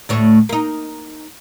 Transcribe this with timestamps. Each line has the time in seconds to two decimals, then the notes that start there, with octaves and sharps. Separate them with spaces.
0.09 D2 A2 C#5
0.49 A#3 D#4